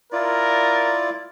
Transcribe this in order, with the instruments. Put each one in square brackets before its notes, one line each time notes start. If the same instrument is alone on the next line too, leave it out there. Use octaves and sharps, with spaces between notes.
[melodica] E4 F4 D5 [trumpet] A#4